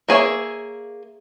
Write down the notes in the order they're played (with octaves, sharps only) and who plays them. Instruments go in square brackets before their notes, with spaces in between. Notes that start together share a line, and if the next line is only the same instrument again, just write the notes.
[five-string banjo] A#3 G#4 C#5 E5